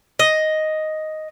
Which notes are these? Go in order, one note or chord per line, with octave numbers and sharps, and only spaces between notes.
D#5